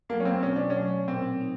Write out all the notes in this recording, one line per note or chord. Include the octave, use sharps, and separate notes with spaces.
F#3 A3 A#3
C#4
C4
B2 C#4
D4
C#4
F#3 A3
A#2 C4
D#4